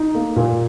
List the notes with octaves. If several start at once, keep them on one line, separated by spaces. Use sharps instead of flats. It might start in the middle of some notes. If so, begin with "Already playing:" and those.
Already playing: D#4
A#3
A#2